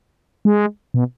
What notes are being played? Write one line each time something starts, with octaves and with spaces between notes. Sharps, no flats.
G#3
B2